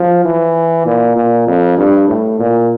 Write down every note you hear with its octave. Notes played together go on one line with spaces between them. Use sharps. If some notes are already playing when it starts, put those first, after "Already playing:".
Already playing: F3
E3
A#2
A#2
F2
G2
A2
A#2